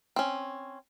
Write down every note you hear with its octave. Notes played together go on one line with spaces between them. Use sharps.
C4 C#4